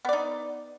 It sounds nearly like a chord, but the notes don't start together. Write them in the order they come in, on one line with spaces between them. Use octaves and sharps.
B3 D5 D#4